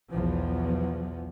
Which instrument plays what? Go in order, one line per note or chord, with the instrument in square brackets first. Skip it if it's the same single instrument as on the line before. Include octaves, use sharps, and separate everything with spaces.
[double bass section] B1 E2 F3